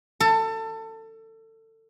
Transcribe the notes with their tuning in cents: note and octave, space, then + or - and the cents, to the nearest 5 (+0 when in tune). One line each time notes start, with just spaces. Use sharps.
A4 +25